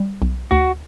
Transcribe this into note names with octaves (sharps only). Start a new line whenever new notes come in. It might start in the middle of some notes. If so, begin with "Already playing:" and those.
Already playing: G3
B1
D2 F#4